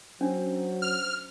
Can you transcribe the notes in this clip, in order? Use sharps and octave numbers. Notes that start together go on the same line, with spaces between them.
F#3 C#4 D4 C5
F6